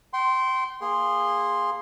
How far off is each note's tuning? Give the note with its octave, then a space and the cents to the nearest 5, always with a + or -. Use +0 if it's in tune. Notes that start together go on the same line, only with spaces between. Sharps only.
G5 -35 C6 +0
A#3 +0 G#4 -20 C6 +0